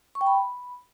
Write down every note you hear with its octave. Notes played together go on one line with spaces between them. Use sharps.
C#6
G5
B5